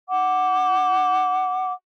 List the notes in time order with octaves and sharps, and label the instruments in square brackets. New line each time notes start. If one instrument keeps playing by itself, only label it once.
[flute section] F#5 D6